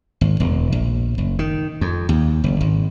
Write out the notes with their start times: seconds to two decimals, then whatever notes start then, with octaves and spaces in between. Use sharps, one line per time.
0.21 G#1
0.40 E1
0.72 A#1
1.18 F#1
1.39 D#3
1.81 F2
2.09 D#2
2.44 F#1
2.61 G#1